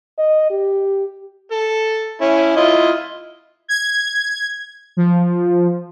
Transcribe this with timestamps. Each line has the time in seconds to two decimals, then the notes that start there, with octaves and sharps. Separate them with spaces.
0.18 D#5
0.51 G4
1.51 A4
2.21 C#4 E4
2.56 E4 F4 D#5
3.68 G#6
4.97 F3